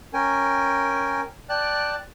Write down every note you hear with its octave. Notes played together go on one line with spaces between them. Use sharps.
C#4 A#4 G5 G#5
D5 G5 A5 F#6